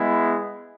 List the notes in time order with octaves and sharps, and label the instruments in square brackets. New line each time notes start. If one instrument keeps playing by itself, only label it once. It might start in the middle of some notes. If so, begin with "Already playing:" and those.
Already playing: [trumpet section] G#3 B3 E4